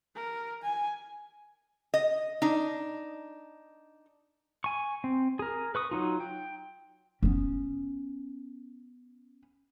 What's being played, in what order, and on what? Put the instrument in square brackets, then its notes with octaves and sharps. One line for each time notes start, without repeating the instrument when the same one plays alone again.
[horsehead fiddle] A#4
G#5
[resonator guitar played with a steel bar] D#5
D4 D#4
[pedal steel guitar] G#5 C#6
C4
G#4 A#4
B4 C#6 D#6
F#3 D#4 F4
G5
[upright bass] B3 C#4